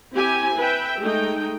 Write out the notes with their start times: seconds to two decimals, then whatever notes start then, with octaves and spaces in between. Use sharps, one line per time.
0.14 C4 E4 G4 G#5
0.57 B4 E5 G5
1.00 G#3 A3 D#4 G5